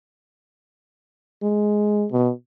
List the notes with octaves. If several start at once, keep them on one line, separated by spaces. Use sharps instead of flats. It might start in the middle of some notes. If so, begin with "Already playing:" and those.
G#3
B2